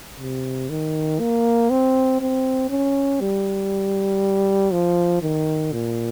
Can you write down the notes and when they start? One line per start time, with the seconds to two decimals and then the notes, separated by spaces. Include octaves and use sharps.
0.19 C3
0.70 D#3
1.20 A#3
1.70 C4
2.21 C4
2.70 C#4
3.21 G3
4.72 F3
5.22 D#3
5.72 A#2